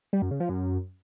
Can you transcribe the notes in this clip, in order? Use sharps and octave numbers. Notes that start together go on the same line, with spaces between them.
G3
F#2
C#3
F3
F#2